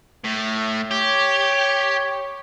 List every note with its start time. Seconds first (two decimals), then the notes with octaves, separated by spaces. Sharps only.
0.24 A2
0.91 G4 C#5